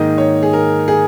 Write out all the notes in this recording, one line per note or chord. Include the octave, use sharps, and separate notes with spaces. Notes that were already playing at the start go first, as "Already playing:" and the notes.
Already playing: G#2 D#3 A#3 D#5
C#5
G#4
A#4
G#4